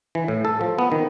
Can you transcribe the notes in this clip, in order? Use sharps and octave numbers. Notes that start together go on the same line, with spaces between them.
E3
A2
A4
F3
B3
D#3